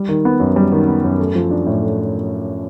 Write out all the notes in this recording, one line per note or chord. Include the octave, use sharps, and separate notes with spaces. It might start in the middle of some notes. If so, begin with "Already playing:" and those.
Already playing: G3
D#3
B3
F#2
G3
D#3
B3
F#2
A3
F3
D4
A2
A3